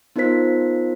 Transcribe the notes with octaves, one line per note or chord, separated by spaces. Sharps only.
B3 D#4 F4 A#4 C5 B6